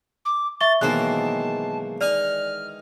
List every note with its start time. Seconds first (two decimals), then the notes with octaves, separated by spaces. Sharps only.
0.25 D6
0.61 E5 C#6 A6 G7
0.81 B1 D#3 E3 G#3 A#3 C5 A5 F#6
2.01 D#4 D5 D#5 G#5 F6